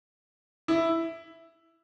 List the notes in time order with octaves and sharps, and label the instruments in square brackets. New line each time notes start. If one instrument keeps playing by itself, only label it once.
[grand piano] E4